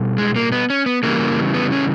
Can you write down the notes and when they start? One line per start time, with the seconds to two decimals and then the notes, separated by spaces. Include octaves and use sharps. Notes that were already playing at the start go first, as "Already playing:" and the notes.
Already playing: B2 G3
0.18 G#3
0.36 A#3
0.52 B3
0.70 C#4
0.86 B3
1.03 C#3 E3 G3 A#3
1.54 B3
1.72 C#4